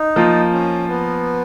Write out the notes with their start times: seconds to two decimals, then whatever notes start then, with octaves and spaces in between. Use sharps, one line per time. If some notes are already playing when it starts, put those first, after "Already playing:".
Already playing: D#4
0.16 F3 A#3 F4
0.52 C#4
0.88 B3